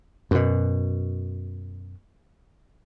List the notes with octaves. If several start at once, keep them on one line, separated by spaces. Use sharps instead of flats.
F#2 B2